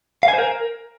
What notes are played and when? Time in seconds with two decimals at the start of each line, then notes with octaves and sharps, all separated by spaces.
0.23 F5
0.28 G#5
0.33 C5
0.38 A#4